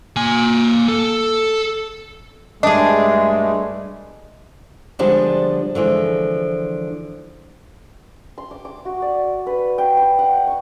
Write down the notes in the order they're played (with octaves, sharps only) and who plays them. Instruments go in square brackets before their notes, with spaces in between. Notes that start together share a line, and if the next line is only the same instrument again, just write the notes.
[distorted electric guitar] A#3 G#5
A4
[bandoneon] G2 A3 [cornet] G#3 [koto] D4 G#4 [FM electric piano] D#5
[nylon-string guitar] D3 F3 G3 G#3 B3 D4
D3 E3 F3 G#3
[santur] C6
D6
D6
F#4
D5
B4
G5
G5
F#5
C#6